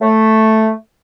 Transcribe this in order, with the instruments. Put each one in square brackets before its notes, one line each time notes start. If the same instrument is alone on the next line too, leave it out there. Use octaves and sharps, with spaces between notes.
[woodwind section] A3